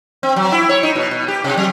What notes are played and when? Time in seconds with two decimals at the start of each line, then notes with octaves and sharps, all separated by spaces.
0.23 C4
0.36 F#3
0.52 E4
0.69 C#5
0.83 D#4
0.95 B2
1.11 B2
1.28 G4
1.44 C3
1.57 F#3